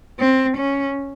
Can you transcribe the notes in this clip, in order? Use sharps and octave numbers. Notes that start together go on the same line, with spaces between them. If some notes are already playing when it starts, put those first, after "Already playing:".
C4
C#4